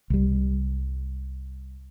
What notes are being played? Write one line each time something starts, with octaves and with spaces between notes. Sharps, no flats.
C2 G3